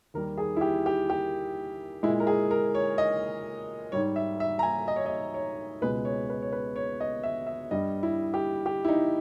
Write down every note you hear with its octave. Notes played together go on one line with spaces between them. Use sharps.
D#2 D#3 G3 A#4
G#4
E4
G4
G4
G4
A#2 G#3 E4
A#4
G#4
A#4
C#5
D#5
G#2 G3 C#5
E5
E5
A#5
G#5
D#5
C#5
D#5
C#5
C#2 B2 G#3 B4
C#5
B4
C#5
B4
C#5
D#5
E5
E5
G2 G3 D#5
E4
G4
G4
E4
D#4